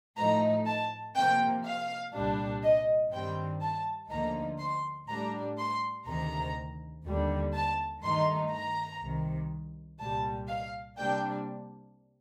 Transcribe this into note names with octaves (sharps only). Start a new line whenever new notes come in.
A2 F3 A3 D#4 A#5
A5
C3 F3 A#3 G5
F5
C2 A#2 G3 D4
D#5
G2 D#3 G3 C4 G5
A5
D2 D3 F3 A#3 D#4 A#5
C6
A2 G3 D4 A#5
C6
D2 C3 D#3 A#5
D#2 D3 G3
A5
G2 D#3 A3 D#4 C6
A#5
C2 C3 D#3
C2 A#2 G3 A5
F5
C3 G3 A#3 D4 G5